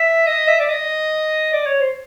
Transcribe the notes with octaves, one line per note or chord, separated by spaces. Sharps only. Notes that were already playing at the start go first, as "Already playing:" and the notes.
Already playing: E5
D#5
E5
D5
D#5
D5
C#5
C5